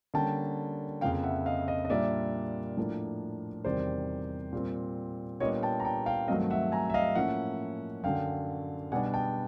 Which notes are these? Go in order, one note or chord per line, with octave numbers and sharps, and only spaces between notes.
D3 G3 A#3 C#4 G5 A5
F2 C#3 F3 A#3 F5 G5
E5 F#5
D#5 F5
D#5 F5
D#5
A#2 G3 A#3 D4 D5 E5
A2 F3 A#3 D4
E2 C3 D#3 G3 C5 D5
A#2 G3 C4
A#2 G3 B3 D4 C#5 D#5
G5 A5
A#5
G5 A5
F5 G5
G2 D#3 F#3 A3 C4 D#5 F5
E5 F#5
G#5 A#5
E5
D#5 F5
A2 F3 A#3 C#4 E5 F#5
F#2 D3 F#3 F5 G5
B2 G3 B3 D4 F#5 G#5
G5 A5